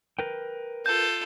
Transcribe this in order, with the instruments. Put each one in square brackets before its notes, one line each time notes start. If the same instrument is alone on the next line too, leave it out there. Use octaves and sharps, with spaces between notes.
[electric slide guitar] A#4 B4 G5
[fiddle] F4 A4 [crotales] G6